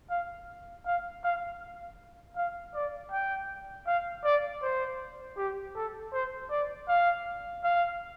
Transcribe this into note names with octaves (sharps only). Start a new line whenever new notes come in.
F5
F5
F5
F5
D5
G5
F5
D5
C5
G4
A4
C5
D5
F5
F5